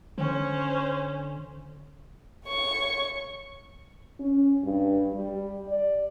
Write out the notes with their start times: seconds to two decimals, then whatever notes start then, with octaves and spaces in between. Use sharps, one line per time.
0.18 D3 C#4 C5
2.46 C#5 C#6
4.20 C#4
4.64 G2
5.13 G3
5.69 D5